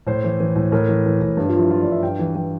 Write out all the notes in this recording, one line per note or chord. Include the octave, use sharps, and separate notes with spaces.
A2 C5
E3
E3
A2
A2 A#4
E3
E3
A2
G2 G4
F4
F3 E4
F3 F4
D5
G2
E5
G2 G5
E3
E3 G5